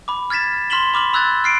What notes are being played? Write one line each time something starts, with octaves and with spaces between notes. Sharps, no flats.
B5 D6
F6 G#6 A6 B6 E7
C6 F6 B6 E7 F#7 G7
B5 D6 F6 F#7
B5 E6 F#6 G#6 A6
F6 C7 D7